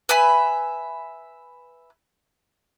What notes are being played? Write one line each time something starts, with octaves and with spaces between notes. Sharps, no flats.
B4 E5 G#5 B5